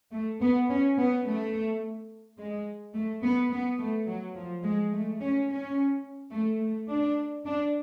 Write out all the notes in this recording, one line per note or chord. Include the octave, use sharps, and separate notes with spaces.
A3
B3
C#4
B3
A3
G#3
A3
B3
B3
A3
F#3
F3
G#3
A3
C#4
C#4
A3
A3
D4
D4